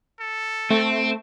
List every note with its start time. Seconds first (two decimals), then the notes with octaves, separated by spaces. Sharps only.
0.20 A4
0.71 A3 C4